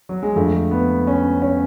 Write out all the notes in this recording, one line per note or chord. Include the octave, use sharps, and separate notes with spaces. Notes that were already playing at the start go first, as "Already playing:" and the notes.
F#3
G#3
F2 D3 F3 A3
B3
C#4
C#4